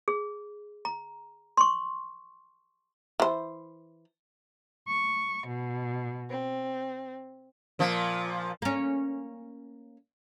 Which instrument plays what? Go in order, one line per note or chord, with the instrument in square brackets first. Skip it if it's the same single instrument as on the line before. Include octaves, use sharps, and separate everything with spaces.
[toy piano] G#4
A#5
C6 C#6
[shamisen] E3 C5
[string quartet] C#6
B2
C4
[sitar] A#2 F3
[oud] A#3 C#4